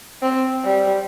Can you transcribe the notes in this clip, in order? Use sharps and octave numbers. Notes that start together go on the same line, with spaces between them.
C4
G3